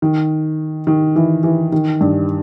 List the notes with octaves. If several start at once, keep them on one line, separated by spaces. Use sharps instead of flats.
D#3
D#3
E3
E3
D#3
G2